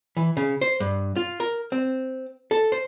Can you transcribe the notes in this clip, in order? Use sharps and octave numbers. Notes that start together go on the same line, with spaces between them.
E3
C#3
C5
G2
F4
A#4
C4
A4
C5